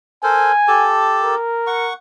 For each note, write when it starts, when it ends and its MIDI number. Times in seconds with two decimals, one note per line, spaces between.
0.23 0.52 69
0.23 0.52 70
0.23 0.52 72
0.23 0.93 80
0.68 1.35 67
0.68 1.35 69
0.68 1.35 81
1.23 1.91 70
1.67 1.93 78
1.67 1.93 85